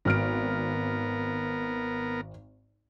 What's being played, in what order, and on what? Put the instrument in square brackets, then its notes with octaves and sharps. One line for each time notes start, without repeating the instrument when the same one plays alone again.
[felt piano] G#1 F6 D7 [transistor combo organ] B3 A#4